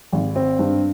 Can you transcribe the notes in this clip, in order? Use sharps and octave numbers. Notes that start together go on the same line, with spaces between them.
G#1
C4
G2